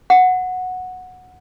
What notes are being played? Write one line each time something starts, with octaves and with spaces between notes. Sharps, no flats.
F#5